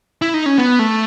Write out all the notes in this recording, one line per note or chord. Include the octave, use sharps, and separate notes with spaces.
E4
D#4
C#4
B3
A3